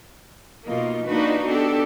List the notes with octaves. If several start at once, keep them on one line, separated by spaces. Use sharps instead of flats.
B2 A#3 D#4 F4
A#3 D4 D#4 F4 F#4 B4
B3 D4 F#4 G4 A4